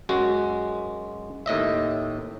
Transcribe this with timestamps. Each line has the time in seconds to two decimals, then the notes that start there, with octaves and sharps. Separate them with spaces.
0.09 F#2 G#3 F#4
1.46 D#2 A2 D#5 E5